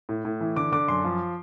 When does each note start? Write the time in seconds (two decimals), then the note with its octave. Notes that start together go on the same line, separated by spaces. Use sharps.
0.09 A2
0.25 A2
0.41 E3
0.56 D3 D6
0.72 D3 D6
0.88 F#2 C6
1.04 F3